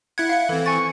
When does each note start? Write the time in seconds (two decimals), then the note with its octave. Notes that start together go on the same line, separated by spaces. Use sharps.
0.18 E4 F#5 G#6 C#7
0.29 F5 C#7
0.49 E3 C4 A4
0.66 G#5 C#6 A6